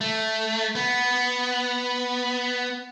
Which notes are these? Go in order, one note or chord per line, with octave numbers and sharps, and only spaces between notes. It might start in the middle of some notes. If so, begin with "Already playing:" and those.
A3
B3